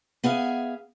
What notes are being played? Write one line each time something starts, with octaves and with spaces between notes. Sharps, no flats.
B3 G#4 E5 F5